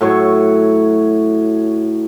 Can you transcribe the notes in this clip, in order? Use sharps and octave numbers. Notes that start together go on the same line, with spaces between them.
A2 F#3 C#5 C#6